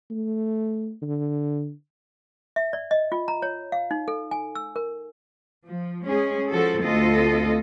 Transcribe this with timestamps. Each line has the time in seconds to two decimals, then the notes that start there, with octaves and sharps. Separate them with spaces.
0.11 A3
1.02 D3
2.56 E5
2.73 D5
2.91 D#5
3.12 F4
3.28 A#5
3.42 C#5
3.72 F5
3.91 D#4
4.08 A4
4.31 G#5
4.55 E6
4.76 A#4
5.65 F3
6.06 G#3 C#4 G#4
6.50 F3 F#4 A4
6.81 D2 C4 F4 A4 D#5